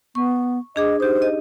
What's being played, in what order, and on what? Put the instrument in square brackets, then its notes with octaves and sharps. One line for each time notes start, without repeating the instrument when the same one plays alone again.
[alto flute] B3 [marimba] C#6
[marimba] D4 G#4 D6 [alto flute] D#5
[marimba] D#4 G4 [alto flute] C5
[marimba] D#5